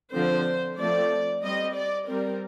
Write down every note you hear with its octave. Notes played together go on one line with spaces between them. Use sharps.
D3 F3 C4 C5
F3 A3 C4 D5
G3 C4 D#5
D5
G3 C4 A#4